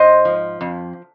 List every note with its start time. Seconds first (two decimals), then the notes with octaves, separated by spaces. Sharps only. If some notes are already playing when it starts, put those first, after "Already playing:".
Already playing: G#2 C5 D#5
0.25 F3
0.61 F2